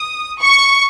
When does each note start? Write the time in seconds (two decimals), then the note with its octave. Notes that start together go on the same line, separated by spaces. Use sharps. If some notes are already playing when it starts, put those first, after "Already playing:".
Already playing: D#6
0.42 C#6